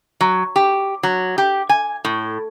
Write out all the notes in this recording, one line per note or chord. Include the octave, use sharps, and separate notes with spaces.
F#3
G4
F#3
G4
G#5
A2